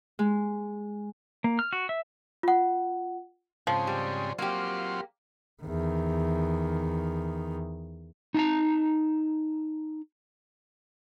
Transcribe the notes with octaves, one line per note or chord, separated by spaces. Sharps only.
G#3
A#3
F6
F#4
E5
F4 F#5
G#2 C#3 F3 C4
G3
F#3 A#3 C4 F4 G4
E2 D#3
D#4 A5 A#5